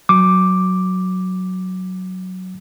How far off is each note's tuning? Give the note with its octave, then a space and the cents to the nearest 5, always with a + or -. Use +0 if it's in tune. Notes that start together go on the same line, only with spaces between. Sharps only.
F#3 +0 D6 +0